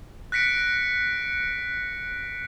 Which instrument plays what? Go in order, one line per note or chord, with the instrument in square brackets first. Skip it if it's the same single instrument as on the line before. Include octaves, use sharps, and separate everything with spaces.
[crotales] F#6 A#6 B6 C#7 D7